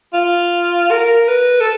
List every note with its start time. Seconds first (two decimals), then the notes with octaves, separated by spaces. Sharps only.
0.13 F4
0.91 A#4
1.29 B4
1.61 A4